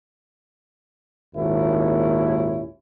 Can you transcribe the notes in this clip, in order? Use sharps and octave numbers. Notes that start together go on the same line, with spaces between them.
G#1 D#2 A#2 C#4 E4